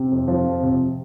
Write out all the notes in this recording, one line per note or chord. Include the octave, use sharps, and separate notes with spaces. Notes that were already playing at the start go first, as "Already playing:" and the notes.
Already playing: C3
F2
F3
F2
C3